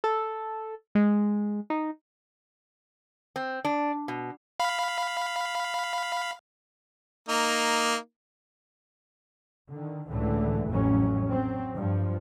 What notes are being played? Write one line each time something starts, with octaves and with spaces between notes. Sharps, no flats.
A4
G#3
D#4
C4
D4
B2
F5 B5
A#3 D#4
D3 D#3
C#2 A2 D3 E3 A3
A1 F2 A2 F#3 C#4
F#3 C4
G2 F3